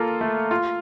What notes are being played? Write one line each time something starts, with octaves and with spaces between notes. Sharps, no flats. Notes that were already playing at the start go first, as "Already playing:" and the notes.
Already playing: A#3 F4 A4
A3
F4